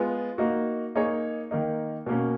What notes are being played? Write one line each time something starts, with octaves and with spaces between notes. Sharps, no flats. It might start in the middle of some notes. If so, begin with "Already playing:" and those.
Already playing: G#3 B3 F4
A#3 D#4 F#4
A#3 D#4 G#4 C#5
D#3 A#3 D#4
B2 A#3 C#4